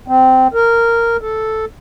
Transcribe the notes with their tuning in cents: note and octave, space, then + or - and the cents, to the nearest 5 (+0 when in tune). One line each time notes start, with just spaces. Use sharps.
C4 -15
A#4 -10
A4 -5